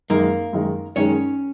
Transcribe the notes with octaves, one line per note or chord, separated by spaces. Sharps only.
F#2 D#3 G#3 A#3 D#4 A#4
F#2 D#3 G#3 D#4
F#2 D#3 G#3 C#4 D#4 C#5